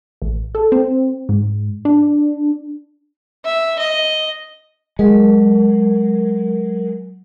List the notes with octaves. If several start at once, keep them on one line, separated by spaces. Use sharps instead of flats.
A1
A4
C4
G#2
D4
E5
D#5
F#3 G#3 A#4